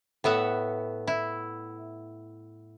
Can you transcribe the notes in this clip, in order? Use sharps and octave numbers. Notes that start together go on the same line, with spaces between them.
A2 B3 E5 F#5
E4